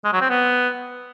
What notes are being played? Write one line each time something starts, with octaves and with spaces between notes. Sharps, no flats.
G#3
F#3
C4
B3